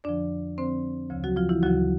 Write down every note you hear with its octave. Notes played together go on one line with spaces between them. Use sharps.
F2 D3 F3 D4 D5
F2 D3 F3 C4 C5
D2 C#3 F3
F#3 F#4
F3 F4
E3 E4
D2 C#3 F3 F#3 F#4